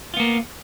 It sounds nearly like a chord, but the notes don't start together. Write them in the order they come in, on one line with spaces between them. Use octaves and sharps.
F4 B3 A#3